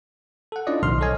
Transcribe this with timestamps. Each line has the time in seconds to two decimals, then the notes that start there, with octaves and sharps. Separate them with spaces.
0.52 A4 F#5
0.67 C#4 D4 E4 F4 D5 D#5
0.83 B1 A2 D#3 F3 C6 F6
1.01 A4 C5 C#5 D#5 G#5